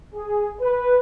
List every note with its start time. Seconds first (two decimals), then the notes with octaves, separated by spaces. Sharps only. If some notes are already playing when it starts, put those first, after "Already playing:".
0.15 G#4
0.60 B4